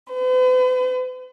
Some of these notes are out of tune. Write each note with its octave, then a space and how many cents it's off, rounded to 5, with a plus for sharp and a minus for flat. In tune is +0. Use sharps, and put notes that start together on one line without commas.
B4 +45